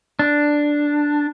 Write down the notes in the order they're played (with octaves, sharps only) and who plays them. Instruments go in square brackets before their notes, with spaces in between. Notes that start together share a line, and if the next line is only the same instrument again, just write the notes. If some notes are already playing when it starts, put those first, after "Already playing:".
[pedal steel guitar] D4